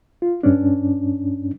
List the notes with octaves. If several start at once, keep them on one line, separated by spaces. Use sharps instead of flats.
F4
G2 C#4 D4